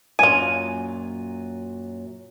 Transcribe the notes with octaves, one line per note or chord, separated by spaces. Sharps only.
F#2 A#2 F#3 F4 G#5 D#7